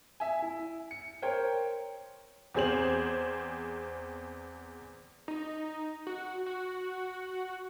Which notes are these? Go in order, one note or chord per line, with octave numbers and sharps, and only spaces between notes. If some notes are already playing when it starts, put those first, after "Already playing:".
E5 G#5
E4
C#7
A#4 C5 C#5 G5
E2 C4 G#4 C5 F#7
D#4
F#4
F#4